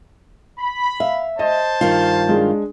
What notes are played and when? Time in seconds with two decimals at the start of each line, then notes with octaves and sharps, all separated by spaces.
0.58 B5
1.00 E5 F5
1.39 C5 D#5 A5
1.81 G2 D#3 F4
2.29 G#3 D4